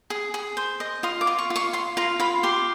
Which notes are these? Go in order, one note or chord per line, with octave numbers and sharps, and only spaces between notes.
G#4
G#4
C5
D#5
F4 D#6
D6
F4
C#6
F4
C#6
F4 C6
F4 A#5
F4 B5
G4 C6